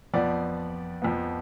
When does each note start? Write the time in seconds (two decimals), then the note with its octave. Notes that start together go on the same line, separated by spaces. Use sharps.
0.13 F2 F3 B3 D5 F#5
1.02 F2 F3 B3